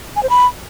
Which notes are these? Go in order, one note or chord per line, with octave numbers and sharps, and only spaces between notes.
G#5
C5
B5